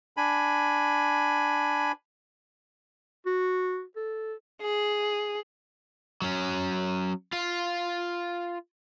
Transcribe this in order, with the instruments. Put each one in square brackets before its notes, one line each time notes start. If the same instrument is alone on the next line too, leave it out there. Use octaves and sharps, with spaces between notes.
[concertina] D4 G#5 B5
[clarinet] F#4
A4
[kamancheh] G#4
[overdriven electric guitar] F#3 C#4
F4 F5